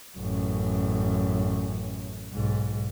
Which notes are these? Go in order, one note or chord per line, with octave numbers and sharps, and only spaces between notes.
A1 F#2
B1 G#2